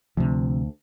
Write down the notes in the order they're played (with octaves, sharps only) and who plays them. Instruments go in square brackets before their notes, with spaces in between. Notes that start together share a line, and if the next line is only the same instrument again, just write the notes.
[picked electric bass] D2 [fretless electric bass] C3 F3